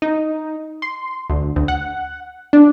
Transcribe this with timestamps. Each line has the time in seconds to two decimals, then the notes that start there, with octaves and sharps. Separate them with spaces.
0.02 D#4
0.82 C6
1.30 D2
1.56 D2
1.68 F#5
2.53 D4